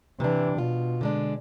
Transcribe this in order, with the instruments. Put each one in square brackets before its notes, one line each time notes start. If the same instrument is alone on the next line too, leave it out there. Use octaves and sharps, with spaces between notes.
[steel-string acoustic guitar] C3 D4 [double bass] E3
[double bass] B2 [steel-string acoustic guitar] F4
[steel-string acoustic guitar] D3 G#3 D4